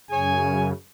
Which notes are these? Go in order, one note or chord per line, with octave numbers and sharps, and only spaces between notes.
F#2 C#3 G#4 C#5 G#5